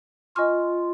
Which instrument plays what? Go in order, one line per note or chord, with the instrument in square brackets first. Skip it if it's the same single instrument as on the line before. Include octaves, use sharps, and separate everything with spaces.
[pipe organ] F4 [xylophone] D#5 G#5 C#6 F6